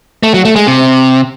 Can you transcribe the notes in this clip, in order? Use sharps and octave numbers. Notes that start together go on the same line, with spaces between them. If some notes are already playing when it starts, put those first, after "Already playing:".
A3
F#3
A3
G#3
C3